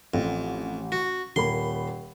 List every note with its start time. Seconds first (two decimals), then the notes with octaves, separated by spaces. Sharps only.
0.14 A1 F2
0.92 F#4
1.36 D#1 A#3 B5 C6